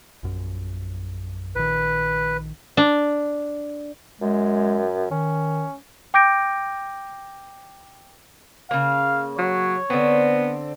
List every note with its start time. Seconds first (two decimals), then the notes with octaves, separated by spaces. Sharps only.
0.23 A#1 F#2
1.55 A#1 D#3 B4
2.77 D4
4.21 F#2 G#3
5.11 D#3 C#4
6.14 G5 D6 G6 A#6 D7
8.71 C#3 A#3 F5
9.39 F#3 C#5
9.90 D3 B3 C4